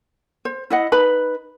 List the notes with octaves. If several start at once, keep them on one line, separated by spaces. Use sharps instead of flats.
C5
E4 D#5 F#5
D#4 B4 B5